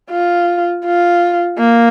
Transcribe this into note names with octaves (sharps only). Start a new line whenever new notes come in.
F4
F4
A#3